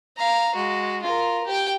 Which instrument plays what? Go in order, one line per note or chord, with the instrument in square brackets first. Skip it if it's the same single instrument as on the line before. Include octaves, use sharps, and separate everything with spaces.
[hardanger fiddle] F5 A#5
G#3 F#4
F4 A#4
G4 G5